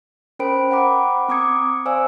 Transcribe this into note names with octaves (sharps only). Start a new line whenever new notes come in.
C#4 A#4 C5 G5 B5 D7
F#5 G5 A#5 B5 D6
C4 A#5 D6 D#6 G#6 C#7
C5 D5 F5 G#5 E6